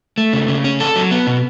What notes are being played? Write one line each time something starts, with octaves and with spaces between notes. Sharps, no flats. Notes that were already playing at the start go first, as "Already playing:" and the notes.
A3
C#3
C#3
C#4
A4
F#3
B3
B2